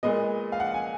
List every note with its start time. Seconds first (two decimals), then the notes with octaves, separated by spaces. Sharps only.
0.03 A#2 G#3 B3 D#5
0.52 F5
0.60 F#5
0.74 G#5